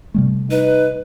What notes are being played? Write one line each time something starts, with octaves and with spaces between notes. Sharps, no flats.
C3 G3 A3
D#4 B4